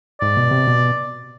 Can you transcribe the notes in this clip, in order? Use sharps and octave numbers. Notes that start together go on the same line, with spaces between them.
G#2 D5
B2
C3
B2